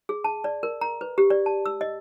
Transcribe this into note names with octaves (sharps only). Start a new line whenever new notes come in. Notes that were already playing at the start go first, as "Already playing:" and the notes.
G#4
A5
D5
A#4
A#5
B4
G4
D5
A5
E6
D#5